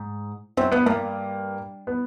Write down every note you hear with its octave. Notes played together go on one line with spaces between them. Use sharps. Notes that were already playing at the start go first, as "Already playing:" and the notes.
Already playing: G#2
F#2 C4
G2 B3
G2 A#3
B3